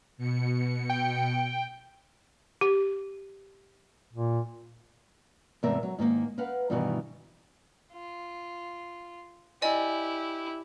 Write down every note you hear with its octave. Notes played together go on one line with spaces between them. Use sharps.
B2 C#7
G5
G4
A#2
E2 G#2 C3 A3 A#4 E5
F#3
G#2 D#3 A#3 F5
A#4 B4 F5 F#5
G2 B2 D#3 E3 F#4 A#4
F4
E4 G4 D5 D#5 G#5